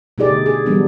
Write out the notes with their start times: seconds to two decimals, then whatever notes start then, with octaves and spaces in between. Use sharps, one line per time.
0.18 B2 A3 D#4 G4 G#4 D5
0.30 D3
0.46 G#4
0.66 E3 F#3 G3 B3 D4